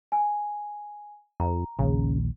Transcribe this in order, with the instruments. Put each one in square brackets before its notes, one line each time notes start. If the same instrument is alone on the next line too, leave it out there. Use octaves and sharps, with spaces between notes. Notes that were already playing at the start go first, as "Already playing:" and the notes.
[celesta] G#5
[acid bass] F2 [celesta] A#5
[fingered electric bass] A#1 D#2 [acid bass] C#3